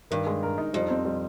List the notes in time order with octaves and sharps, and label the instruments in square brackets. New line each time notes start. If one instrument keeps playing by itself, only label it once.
[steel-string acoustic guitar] G2 [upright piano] D#3
[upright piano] G#3
A#4
D#4
[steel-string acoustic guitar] F2 [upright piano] G3
[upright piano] C4
G3